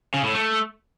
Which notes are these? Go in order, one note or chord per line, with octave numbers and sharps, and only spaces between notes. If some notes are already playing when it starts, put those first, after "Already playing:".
C#3
A2
A3